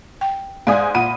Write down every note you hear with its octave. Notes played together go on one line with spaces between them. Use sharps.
G5
G#2 D5 F5 G#5 D#6
A#2 F#5 B5 D#7